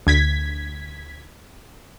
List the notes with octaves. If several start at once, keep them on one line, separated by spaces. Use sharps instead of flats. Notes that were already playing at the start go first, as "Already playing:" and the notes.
D2 G#6 B6